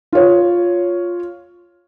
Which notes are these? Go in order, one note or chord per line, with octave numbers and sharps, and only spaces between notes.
F4 C#5